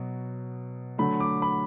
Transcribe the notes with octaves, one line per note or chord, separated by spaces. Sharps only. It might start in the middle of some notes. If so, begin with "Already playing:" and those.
Already playing: B2 F#3 B3
D3 F#3 A3 B5
D6
B5